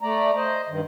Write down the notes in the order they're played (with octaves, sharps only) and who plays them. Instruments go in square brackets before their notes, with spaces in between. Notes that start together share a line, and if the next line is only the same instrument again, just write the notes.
[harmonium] A3 D5 A#5
C5 D#5
G2 D#3